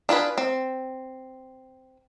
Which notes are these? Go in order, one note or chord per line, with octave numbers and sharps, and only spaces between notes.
D4 F4 G#4 B4
C4